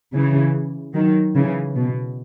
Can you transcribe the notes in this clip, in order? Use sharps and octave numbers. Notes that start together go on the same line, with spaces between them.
C#3 E3
D#3 F#3
C#3 E3
B2